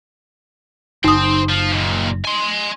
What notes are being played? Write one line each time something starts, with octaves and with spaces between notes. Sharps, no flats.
F#1 D#4 C5 G5 D#6
F3
D#2 A#2
G#5 C6